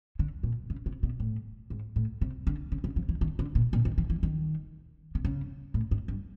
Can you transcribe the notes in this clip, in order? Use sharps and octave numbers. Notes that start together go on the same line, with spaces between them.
D3
A#2
C#3
C3
B2
A2
G#2
A2
C3
D3
C#3
C#3
F3
E3
D#3
D3
A#2
A#2
D#3
E3
E3
D#3
C3
C#3
A2
G#2
G2